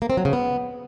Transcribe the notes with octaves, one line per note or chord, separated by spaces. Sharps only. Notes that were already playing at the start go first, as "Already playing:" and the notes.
A#3
C4
F#3
C#3
B3